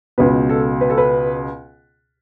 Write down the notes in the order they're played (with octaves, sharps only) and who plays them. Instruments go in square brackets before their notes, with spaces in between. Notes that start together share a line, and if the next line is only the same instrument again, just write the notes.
[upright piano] C#2 B2 B4
A4
B4
A4
B4